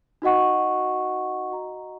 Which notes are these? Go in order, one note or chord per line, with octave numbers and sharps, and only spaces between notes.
D#4 F#4 D#5 F#5 C#6
F#4 D#5 A#5